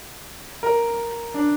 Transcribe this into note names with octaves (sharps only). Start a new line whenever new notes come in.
A#4
D4